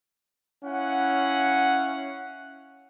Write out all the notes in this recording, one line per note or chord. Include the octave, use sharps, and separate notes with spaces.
C#4 E4 F5 F#5